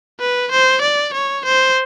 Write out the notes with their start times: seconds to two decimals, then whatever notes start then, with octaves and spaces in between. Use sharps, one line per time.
0.20 B4
0.51 C5
0.81 D5
1.13 C#5
1.45 C5